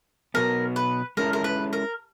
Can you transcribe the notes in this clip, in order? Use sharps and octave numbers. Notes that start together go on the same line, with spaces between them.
B2 F#3 B3 A#4
B4
G#3 C#4 E4 A4 A#4
A#4
B4
A#4